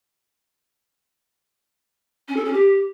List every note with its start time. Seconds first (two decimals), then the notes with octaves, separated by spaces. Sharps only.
2.28 C#4
2.36 A4
2.45 C#4
2.53 G4